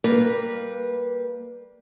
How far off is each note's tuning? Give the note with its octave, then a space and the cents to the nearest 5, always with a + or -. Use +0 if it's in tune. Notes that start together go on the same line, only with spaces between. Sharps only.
G3 +0 A#3 +0 B4 -15